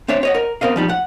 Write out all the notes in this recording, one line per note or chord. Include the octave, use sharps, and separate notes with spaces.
C4 D4 C#5 E5
C#5 D#5 F#5
A#4
B3 C4 A#4 D#5 F5
F3 G3 D#4
F#5